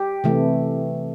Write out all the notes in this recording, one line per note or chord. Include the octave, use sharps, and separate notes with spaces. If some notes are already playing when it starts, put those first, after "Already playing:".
Already playing: G4
C3 E3 A3